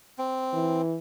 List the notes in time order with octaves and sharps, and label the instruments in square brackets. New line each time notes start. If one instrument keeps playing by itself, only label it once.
[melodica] C4
[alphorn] E3